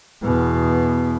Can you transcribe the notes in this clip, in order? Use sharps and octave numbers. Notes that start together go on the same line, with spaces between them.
E2 B2